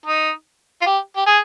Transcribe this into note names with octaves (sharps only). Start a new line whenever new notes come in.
D#4
F4
G4
G4
G#4